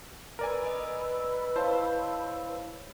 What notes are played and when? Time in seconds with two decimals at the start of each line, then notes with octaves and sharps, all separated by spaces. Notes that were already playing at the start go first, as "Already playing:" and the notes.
0.39 A#4 B4 D5 G#5 B5 E6
0.66 D#5
1.56 E4 C5 C#5 F5 A5